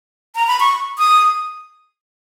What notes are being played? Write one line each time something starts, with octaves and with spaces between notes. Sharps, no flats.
A#5
B5
C#6
D#6